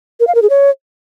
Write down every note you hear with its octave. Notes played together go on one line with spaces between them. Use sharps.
A#4
F5
A#4
G#4
C#5